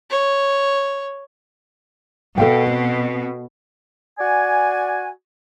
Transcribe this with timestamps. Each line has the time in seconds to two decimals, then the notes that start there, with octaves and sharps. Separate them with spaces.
0.10 C#5
2.38 B2 A4 F5 G5
2.67 C4
4.19 F#4 D5 G#5